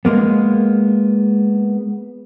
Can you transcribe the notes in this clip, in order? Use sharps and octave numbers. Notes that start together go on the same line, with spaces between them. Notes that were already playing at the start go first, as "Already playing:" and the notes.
G#3 A#3 B3